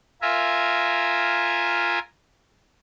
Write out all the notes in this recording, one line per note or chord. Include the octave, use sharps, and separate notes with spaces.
F4 A#4 E5 G#5